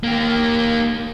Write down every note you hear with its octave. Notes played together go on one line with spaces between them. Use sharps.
A#3 G4